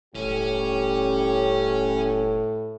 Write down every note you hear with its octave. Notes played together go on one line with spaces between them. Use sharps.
E1 A2 G3 C#4 D4 G4